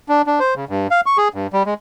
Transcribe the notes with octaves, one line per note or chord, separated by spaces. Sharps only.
D4
D4
C5
C#3
G2
F5
C#6
G#4
G2
G3
G#3